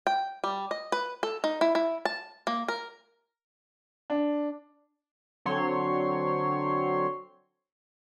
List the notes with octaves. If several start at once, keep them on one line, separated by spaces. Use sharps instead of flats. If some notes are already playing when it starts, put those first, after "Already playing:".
G5
G3
D#5
B4
A4
D#4
E4
E4
A5
A#3
A#4
D4
D3 F#3 C4 C#5 C6